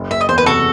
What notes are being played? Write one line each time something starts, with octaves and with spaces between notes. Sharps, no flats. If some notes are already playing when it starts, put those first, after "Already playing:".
Already playing: F#1
F#1 E5
D#5
E2 C5
B4
C3 F#4 A4